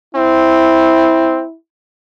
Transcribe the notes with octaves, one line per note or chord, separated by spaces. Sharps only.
C4 E4